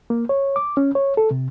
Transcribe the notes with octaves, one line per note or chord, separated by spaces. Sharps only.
A#3
C#5
D6
C#4
C#5
A4
C3